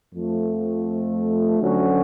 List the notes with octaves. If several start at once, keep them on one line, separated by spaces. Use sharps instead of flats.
F2 F3 A3
D2 D3 F#3 C#4 F#4